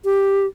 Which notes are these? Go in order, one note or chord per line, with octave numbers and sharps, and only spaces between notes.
G4